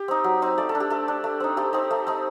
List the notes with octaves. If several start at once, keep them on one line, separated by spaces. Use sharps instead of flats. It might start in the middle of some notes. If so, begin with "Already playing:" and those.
Already playing: G4
C4 D#4
F#3
C4 D#4
A3 D5
A4
D4
G4
A3 A4
D4
A3
C4 D#4
A3 G4
C4 D#4
A3
C4 D#4